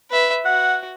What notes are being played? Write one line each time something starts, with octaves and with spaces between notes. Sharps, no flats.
B4 E5
F#4 F#5